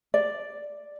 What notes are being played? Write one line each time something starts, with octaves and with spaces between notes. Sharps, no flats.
D5